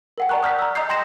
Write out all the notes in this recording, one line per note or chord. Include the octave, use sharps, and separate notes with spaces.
A#4 F#5 G5
D5 A5 A#5 C#6 F#6
D#6 F6 G6 B6
A#5 E6
D#5 A#5 D#6 G6 C7
G5 C6 G6 A#6 E7